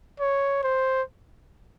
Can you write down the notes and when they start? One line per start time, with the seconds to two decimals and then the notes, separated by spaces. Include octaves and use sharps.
0.20 C#5
0.63 C5